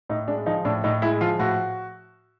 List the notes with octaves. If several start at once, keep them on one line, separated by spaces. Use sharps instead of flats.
A2 D#4
G#3 D4
F3 D#4
A2 D4
A2 D#4
G#3 E4
F3 F4
A2 F#4